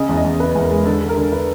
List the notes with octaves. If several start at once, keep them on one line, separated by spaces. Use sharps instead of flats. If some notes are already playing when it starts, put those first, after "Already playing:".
Already playing: C#3 D#5
E2
D#5
E2
C#3 B4
E2
A#4
G#3
D3 A4
D3
A#4
D3
D3 B4